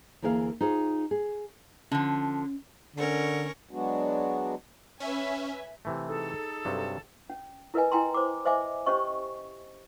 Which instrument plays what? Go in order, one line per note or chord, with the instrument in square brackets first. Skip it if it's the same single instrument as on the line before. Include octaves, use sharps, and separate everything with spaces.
[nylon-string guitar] D2 E3 A#3 G#4 D5 F5
D#4 F4 G#4 C5
G#4
[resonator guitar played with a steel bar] D3 F3 [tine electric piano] C#4
[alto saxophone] D3 [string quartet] C#4 A#4 C#6
[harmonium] F#3 G#3 B3 D4 F#4
[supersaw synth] C#4 [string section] B4 E5 G#5
[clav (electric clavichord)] C3 E3 A3
[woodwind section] D#4 G#4 A4
[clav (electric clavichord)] G2 C3 F#3
[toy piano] C#4
E4 A#4 B4 D#5 G#5
E4 G5 G#5 A#5 C6
C5 D6
C5 D#5 E5 G#5 D6
C#4 G4 C5 D#5 C#6